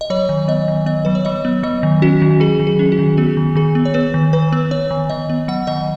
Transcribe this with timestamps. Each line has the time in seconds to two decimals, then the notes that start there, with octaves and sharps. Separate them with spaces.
0.01 D#5
0.10 F#3 C#5
0.29 D#3
0.48 B3 D#5
0.68 D#3
0.86 B3 D#5
1.05 F#3 B4
1.15 C#5
1.25 F#3 D#5
1.45 B3
1.63 F#3 D#5
1.83 D#3
2.02 C#4 F#4
2.22 D#3
2.40 F#3 G#4
2.60 D#3
2.67 G#4
2.79 C#4
2.92 F#4
2.99 D#3
3.18 B3 G#4
3.37 D#3
3.56 D#3 G#4
3.75 B3
3.85 C#5
3.94 B3 B4
4.14 D#3
4.33 D#3 B4
4.53 B3
4.71 B3 C#5
4.91 D#3
5.10 D#3 D#5
5.30 B3
5.48 F#3 F#5
5.67 D#3 D#5